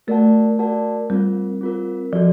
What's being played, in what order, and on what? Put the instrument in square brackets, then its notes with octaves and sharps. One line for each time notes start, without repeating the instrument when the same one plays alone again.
[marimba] A3 [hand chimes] F#4 A#4 D5 F#5 A5
[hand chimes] F#4 A#4 D5 F#5 A5
[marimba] G3 [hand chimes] C4 F4 A#4
[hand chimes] C4 F4 A#4
[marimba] F3 [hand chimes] F#4 A4 D5